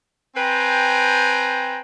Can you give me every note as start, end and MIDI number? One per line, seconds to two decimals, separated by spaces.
0.36 1.80 60
0.36 1.80 71
0.36 1.80 72
0.36 1.80 79
0.36 1.80 80
0.36 1.80 82